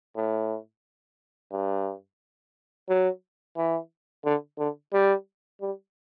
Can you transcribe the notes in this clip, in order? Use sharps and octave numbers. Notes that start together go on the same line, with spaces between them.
A2
G2
F#3
E3
D3
D3
G3
G3